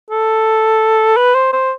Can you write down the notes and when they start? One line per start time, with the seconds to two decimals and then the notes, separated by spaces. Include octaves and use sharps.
0.10 A4
1.17 B4
1.34 C5
1.53 C5